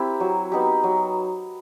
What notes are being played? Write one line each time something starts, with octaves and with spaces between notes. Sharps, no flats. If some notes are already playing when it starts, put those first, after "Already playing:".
Already playing: C4 E4 G4 A#4
F#3
B3 D#4 G4
F#3